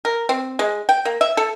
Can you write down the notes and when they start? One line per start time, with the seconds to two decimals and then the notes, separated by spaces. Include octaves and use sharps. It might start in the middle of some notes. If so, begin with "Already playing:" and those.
0.05 A#4
0.29 C4
0.59 G#3
0.89 G5
1.05 A#3
1.21 E5
1.37 A4